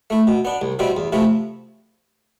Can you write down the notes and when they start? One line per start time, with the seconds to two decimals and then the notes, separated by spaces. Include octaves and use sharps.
0.10 A3 E4
0.27 B2
0.45 B3 D4
0.61 C2
0.79 B2 G3 C4 E4
0.97 E2
1.13 C3 F3 A3 E4